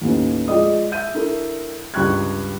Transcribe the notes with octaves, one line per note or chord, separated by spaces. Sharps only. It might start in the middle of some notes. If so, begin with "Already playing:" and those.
D#2 A2 D#3 B3 C#4
F3 G#3 D5 D#5 D#6
E5 G6 D#7
D4 E4 A4 A#4
C#2 G2 C#6 F#6 G#6